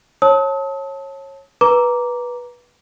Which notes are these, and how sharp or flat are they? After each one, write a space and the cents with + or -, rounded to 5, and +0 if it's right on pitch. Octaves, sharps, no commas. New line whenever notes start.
C#5 -25 A5 +0 D#6 +45
B4 -15 A#5 +5 D6 -10